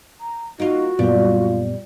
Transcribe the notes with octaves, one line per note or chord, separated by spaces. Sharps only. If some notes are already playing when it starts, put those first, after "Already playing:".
A#5
A#3 D#4 F4 F#4
F#2 A#2 G3 B3 F4